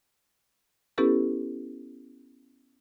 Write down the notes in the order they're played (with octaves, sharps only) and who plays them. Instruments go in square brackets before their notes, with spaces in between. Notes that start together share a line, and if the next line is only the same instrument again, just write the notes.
[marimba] B3 C#4 E4 G4 A4 B4